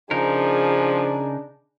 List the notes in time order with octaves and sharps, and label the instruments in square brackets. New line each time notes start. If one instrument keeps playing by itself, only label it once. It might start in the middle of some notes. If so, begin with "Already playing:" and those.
[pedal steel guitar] C#3 D#4 A#4 [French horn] F3 [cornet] D4 [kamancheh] G#4